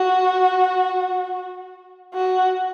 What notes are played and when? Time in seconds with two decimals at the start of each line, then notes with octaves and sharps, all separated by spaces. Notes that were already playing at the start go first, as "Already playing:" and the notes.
Already playing: F#4
2.14 F#4